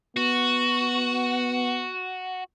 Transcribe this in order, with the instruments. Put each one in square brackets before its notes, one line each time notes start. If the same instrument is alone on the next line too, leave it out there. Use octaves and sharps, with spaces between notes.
[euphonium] B3 [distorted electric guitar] F#4